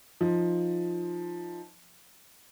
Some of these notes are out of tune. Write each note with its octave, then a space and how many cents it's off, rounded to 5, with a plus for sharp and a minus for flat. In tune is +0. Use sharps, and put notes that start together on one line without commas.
F3 +0 D#4 +0